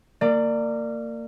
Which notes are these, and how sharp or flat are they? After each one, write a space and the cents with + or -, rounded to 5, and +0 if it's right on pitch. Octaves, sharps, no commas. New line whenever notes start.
A#3 -30 D5 +15